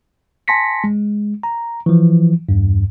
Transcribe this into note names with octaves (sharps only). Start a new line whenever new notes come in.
G#5 A5 C6 A#6 B6 C#7
G#3
A#5
E3 F3
E2 G2